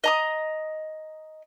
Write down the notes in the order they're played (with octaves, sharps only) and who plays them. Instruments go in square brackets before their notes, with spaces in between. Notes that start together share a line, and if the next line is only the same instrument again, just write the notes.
[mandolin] D#5 A#5 D#6